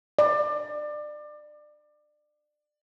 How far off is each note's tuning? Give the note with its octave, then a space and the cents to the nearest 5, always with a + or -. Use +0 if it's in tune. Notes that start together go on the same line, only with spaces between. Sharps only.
D5 +25